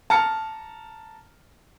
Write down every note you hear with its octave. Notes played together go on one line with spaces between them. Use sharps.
A5 A#5 F6 C#7